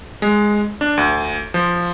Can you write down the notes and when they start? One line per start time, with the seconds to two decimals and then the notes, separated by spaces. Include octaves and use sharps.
0.22 G#3
0.81 D4
0.97 D2
1.54 F3